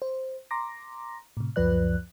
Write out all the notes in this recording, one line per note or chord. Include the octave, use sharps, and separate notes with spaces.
C5
A#5 C6 D6 A#6
A2 C3
C#2 F#2 F3 B4 D5 F#6